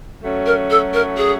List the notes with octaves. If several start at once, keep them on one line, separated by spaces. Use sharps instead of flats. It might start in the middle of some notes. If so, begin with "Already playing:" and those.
F#3 A3 C#4
A#4
A4
A#4
G#4